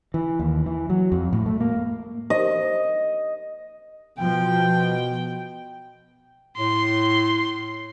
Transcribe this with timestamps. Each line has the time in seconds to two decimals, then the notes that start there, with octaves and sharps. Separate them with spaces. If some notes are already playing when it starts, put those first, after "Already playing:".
0.14 E3
0.39 D#2
0.66 E3
0.90 F#3
1.12 F2
1.33 A2
1.46 A3
1.60 A#3
2.30 D#5
4.19 B2 F3 G5
6.57 A2 C6